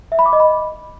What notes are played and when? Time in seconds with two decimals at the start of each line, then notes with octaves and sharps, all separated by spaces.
0.12 E5
0.19 B5
0.26 D6
0.33 D#5
0.40 B5